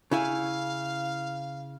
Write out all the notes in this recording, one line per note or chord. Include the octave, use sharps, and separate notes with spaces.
C#3 E4 F5 G#5